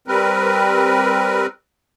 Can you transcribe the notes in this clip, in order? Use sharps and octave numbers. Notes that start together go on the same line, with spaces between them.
G3 C4 A#4 B4